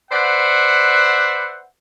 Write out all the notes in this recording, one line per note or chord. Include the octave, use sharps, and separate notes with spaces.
B4 C5 D5 E5 F#5